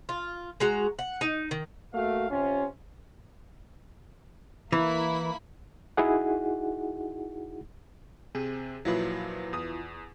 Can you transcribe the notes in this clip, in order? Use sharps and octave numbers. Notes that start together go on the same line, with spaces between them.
F4
G#3 F#4 A#5
F#5
D#4
D#3
A3 A#3 F#4 F5
C3 C#4 F4
E3 A#3 E4 B5
D#4 E4 F#4 G#4 F#5
C3 C4 G#4
A#2 F3 F#3 E4 F4 B4
E2 D#6